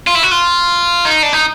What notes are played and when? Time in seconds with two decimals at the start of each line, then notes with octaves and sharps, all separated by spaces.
0.07 F4
0.15 E4
0.23 F#4
0.31 F4
1.05 D#4
1.23 D4
1.33 D#4